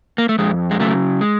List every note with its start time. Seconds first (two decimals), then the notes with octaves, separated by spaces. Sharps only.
0.18 A#3
0.29 A3
0.39 F2 G#3
0.71 G#3
0.80 C#3 F#3 A3
1.21 G#3